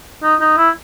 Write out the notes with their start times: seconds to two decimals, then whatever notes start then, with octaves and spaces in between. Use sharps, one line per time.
0.23 D#4
0.40 D#4
0.57 E4